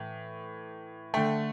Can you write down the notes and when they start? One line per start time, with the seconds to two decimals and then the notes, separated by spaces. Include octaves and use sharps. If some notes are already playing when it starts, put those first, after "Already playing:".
Already playing: A2 E3
1.14 D3 A3 G5